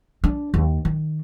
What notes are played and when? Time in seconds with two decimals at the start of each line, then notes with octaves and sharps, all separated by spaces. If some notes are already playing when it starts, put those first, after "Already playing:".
0.24 D4
0.54 D#2
0.85 D#3